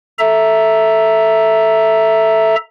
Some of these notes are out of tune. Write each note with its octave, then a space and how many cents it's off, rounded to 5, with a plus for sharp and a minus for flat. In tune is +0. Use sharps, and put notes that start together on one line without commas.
A4 +0 E5 +0 A#5 +0